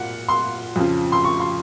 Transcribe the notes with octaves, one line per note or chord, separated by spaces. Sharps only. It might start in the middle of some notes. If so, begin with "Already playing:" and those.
Already playing: A#2 F#5
C6
F2 C#3 F3
C6
C#6
C6